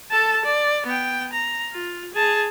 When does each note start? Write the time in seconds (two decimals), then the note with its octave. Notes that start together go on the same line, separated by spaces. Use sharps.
0.11 A4 A5
0.45 D5
0.86 B3 G5
1.33 A#5
1.72 F4
2.14 G#4 A5